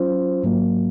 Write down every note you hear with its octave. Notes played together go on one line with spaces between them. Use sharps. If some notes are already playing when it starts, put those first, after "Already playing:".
Already playing: F#3 C#4 F4 C5
G#2 F#3 A#3